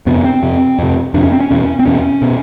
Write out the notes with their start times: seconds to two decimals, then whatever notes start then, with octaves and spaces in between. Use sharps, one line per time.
0.06 F2 C3 B3
0.24 C4
0.43 F2 C3
0.79 F2 C3
1.14 F2 C3 D4
1.23 C#4
1.32 C4
1.40 C#4
1.50 E2 B2
1.79 C4
1.86 E2 B2 C#4
2.22 B2